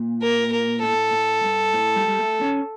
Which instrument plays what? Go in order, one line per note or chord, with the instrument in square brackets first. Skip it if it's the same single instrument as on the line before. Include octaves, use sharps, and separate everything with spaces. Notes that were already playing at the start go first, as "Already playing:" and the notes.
Already playing: [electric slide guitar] A#2
[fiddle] A#4
A#4
[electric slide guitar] A2 [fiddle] A4
[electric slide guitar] A2
G2
A2
G3
G3
A3
C#4